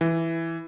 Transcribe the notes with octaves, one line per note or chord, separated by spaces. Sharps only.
E3